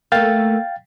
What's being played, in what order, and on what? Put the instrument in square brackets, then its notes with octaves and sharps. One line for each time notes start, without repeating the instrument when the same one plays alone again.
[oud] A3 A#3 [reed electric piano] F5 G5 A6